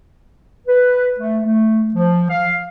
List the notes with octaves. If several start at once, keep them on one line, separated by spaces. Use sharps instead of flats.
B4
A3
A3
F3
F5